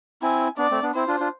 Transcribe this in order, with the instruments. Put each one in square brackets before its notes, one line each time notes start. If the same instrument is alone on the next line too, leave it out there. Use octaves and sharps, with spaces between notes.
[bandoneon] C4 E4 [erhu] G#5
[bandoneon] B3 D4 [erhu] D5
[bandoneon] A3 C4
B3 D4
[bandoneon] C4 E4 [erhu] C5
[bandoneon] D4 F4
D4 F4